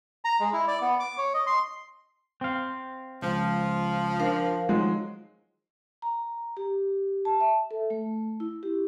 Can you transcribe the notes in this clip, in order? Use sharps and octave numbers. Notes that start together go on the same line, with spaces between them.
A#5
G#3
E4
D5
B3
D6
C#5
D#5
C6
C4 F5
C#2 F3
D4 A#4 C5 F5
D#3 F3 F#3 G#3
A#5
G4
A5
E5
A4
A3
E4
G4